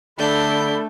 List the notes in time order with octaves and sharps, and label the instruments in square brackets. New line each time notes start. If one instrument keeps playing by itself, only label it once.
[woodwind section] D3 D5 B5 [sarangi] A3 [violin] D4 G6 [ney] A4